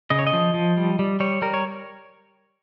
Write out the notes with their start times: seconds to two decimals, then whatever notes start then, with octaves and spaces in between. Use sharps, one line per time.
0.10 C#3 D#5
0.19 C#5
0.27 D#5
0.33 F3
0.54 F3
0.77 G3
0.99 G3
1.20 G3 C#5
1.42 G3 A#4
1.54 C#5